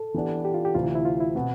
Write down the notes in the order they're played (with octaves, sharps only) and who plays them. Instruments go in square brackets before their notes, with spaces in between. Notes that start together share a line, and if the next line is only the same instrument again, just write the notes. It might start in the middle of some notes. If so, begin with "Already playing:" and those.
Already playing: [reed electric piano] A4
[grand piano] E3 B3 D4 G4
[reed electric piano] G4
F4
G4
[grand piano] D2 C3 E3 [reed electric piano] F4
[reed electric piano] E4
E4
F4
E4
[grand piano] B2 B3 [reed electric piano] C4